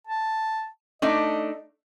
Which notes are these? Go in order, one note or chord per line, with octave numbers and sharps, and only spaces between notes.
A5
A3 D4 D#4 D#5